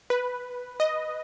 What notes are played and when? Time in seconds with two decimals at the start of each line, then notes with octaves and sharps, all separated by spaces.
0.10 B4
0.80 D#5